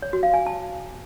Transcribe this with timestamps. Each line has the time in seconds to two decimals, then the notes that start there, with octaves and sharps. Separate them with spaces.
0.02 C#5
0.13 F#4
0.23 F5
0.34 G#5
0.46 A5